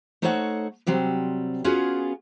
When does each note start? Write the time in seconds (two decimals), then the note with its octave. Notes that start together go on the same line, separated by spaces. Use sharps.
0.22 A3 D#4 A4 C5 C#5 F#5
0.87 C3 F#3 G3 C4
1.64 B3 C#4 F4 F#4 G#4